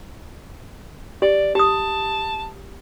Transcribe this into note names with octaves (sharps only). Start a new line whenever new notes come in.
G4 D5
G4 A5 D#6